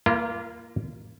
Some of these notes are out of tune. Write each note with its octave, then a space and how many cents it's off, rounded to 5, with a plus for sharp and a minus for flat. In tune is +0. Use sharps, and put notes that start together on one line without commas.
A#3 +0 F4 -35 B4 -45